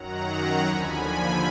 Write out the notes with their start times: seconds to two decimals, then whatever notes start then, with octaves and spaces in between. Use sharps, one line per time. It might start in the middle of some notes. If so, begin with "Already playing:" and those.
Already playing: F#2 D#3 F#3 F#5 A#5
0.66 D#2 D3 F3 G#5 B5